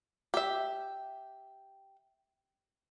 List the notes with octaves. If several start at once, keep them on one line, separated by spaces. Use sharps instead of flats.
G4 E5